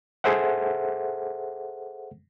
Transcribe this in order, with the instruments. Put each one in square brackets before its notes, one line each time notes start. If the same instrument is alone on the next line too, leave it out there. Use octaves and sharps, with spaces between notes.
[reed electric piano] G#4 A4 C5 E5 F#5